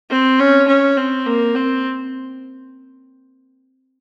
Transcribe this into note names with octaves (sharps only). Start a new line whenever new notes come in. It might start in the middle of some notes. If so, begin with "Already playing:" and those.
C4
C#4
C#4
C4
A#3
C4